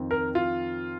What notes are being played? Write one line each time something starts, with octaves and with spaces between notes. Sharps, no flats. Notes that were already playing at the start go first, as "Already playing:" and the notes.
Already playing: F2 D#3 C4
A#4
F4